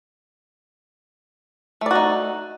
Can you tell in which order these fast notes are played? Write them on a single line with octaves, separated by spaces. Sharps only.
A3 D5 F#4 D#4